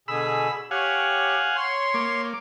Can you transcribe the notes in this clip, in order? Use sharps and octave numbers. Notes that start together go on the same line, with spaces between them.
B2 D3 G#4 B5 E6
G4 C#5 F5 F#5 G#5
C#5 C6
A#3 D6